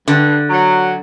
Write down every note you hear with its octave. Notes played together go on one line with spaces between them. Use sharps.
G2 D3
F#3